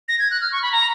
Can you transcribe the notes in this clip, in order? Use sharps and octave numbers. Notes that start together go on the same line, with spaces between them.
A#6
G#6
F#6
F6
C#6
B5
A#5